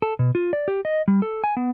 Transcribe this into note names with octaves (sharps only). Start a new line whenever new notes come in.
A4
B2
F4
D5
G4
D#5
G3
A4
G#5
B3